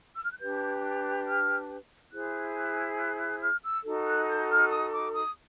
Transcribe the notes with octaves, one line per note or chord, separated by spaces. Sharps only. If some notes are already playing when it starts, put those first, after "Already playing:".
E6
F6
F#6
D4 G4 B4 G6
F#6
F6
E4 G#4 C5 F#6
F#6
F#6
F#6
F6
E6
D#4 F#4 A4
F#6
G6
F6
D#6
D6
D#6